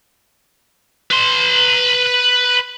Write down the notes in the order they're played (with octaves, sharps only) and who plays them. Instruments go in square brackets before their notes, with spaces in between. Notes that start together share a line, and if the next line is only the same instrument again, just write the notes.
[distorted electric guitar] B4 C6